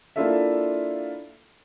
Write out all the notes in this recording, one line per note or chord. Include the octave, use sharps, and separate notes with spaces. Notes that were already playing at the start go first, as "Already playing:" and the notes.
A#3 D4 E4 F4 A4 E5